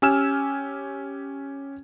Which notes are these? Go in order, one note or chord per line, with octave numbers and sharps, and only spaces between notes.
C#4 G4 G#5 E6 F6 E7